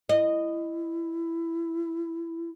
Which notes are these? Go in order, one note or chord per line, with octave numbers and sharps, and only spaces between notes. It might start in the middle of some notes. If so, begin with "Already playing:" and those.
E4 D#5